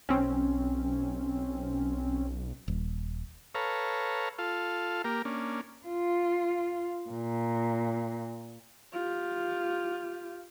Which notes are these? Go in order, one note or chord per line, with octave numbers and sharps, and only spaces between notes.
B1 C4 C#4
D#1
A4 B4 C#5 F5 A#5
F4 A4 F5
A#3 G4 A#4
A#3 C#4 D4
F4
A#2
F4 G4